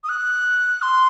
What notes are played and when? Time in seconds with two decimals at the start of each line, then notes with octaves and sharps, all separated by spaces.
0.04 D#6
0.09 F#6
0.82 C6